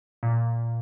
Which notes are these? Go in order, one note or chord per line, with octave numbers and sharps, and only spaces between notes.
A#2